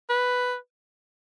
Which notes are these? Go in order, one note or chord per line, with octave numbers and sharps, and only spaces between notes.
B4